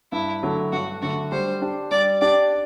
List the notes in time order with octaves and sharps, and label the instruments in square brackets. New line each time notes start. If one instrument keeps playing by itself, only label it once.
[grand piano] G2 [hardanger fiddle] E4
[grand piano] D3 F#3 A3
[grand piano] G2 [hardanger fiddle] F#4
[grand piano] D3 F#3 A3 [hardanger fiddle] F#4
[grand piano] G3 [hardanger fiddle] C5
[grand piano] D4 G4
[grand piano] G3 [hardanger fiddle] D5
[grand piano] D4 G4 [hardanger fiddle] D5